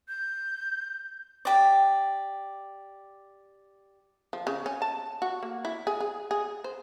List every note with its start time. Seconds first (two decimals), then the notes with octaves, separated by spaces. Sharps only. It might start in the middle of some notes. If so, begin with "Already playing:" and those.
0.09 G6
1.45 G4 D5
4.33 F3
4.47 C#3
4.66 C#4
4.82 A5
5.22 F#4
5.43 A#3
5.65 E4
5.87 G#4
6.00 G#4
6.31 G#4
6.64 C5